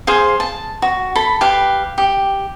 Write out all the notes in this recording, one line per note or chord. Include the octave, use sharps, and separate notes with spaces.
G#4 C5 F5
A5
F#4
A4 B5
G4 B4 F5
G4